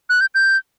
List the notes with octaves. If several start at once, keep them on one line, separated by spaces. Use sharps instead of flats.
F#6
G6
G6